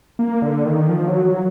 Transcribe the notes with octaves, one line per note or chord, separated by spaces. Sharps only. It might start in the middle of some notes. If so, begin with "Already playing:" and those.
A#3
D3
D#3
F3
F#3
F#3